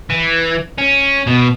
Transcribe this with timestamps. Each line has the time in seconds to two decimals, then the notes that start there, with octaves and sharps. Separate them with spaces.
0.10 E3
0.78 C#4
1.27 B2